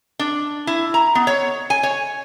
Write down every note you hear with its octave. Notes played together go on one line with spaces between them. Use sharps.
D4
E4
A#5
B3
C#5
G#5
C#5